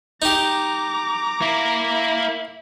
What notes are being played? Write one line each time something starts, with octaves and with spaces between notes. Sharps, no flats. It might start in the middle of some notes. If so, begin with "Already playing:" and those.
D#4 G4 A#5 D6
A#3 E4